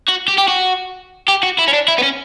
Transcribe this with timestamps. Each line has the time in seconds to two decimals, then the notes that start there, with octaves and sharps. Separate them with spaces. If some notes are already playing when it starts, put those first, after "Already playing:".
0.08 F#4
0.28 G4
0.38 G4
0.48 F#4
1.28 G4
1.43 F#4
1.58 E4
1.68 C#4
1.73 D4
1.88 E4
1.98 B3
2.03 C#4